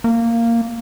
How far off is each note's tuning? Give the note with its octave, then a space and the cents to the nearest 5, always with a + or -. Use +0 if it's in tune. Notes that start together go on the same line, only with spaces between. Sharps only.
A#3 -10